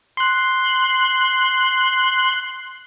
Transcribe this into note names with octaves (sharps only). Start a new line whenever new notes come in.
C6 F#6